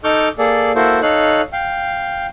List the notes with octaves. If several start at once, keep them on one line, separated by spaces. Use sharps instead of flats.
D#4 A4 C#6 D6 F6 G6
A#3 G#4 A4 D5
A#3 E4 F#4 A4 C5
D#4 A4 C#5 F5 F#6
F5 G5